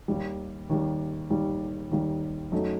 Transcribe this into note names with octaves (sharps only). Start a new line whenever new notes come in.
D#2 D#3 G3
D#2 D#3 G3
D#2 D#3 G3
D#2 D#3 G3
F#2 F#3 A3 D#4